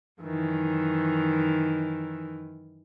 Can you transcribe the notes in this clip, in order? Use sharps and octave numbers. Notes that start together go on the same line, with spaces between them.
F#2 D#3 E3